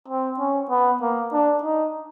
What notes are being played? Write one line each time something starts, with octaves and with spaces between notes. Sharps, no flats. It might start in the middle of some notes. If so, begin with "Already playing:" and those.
C4
C#4
B3
A#3
D4
D#4